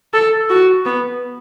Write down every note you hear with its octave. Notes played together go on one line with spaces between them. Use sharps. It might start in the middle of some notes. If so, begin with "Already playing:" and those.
A4
F#4
B3